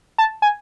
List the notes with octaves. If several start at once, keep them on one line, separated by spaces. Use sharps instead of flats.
A5
G#5